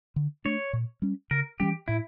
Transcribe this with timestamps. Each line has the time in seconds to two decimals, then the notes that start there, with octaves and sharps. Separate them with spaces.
0.16 D3
0.45 A3 D4 C#5
0.73 A#2
1.02 G3 C#4
1.31 C#3 A#4
1.60 E3 G3 C#4 G4
1.88 A2 E4